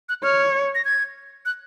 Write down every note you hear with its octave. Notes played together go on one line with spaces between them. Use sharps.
F#6
C#5 F6
A#6
G#6
F#6